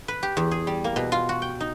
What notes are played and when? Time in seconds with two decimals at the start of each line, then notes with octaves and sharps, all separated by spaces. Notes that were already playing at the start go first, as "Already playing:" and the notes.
0.08 B4
0.23 G4
0.37 E2
0.51 G#4
0.67 G3
0.84 A#3
0.96 B2
1.12 F4
1.29 F#4
1.42 G5
1.60 D#4